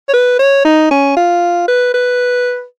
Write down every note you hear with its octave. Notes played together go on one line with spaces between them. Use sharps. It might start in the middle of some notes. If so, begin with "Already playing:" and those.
C#5
B4
C#5
D#4
C#4
F4
B4
B4